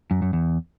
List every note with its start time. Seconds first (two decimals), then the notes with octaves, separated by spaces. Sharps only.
0.11 F#2
0.22 F#2
0.33 E2